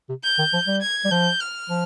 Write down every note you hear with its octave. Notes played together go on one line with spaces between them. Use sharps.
C3
G6
D#3
F3
G3
G#6
G3
F3 G6
F6
F3